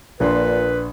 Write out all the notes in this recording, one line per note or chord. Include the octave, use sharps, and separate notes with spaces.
A#1 A#2 D4 B4 C6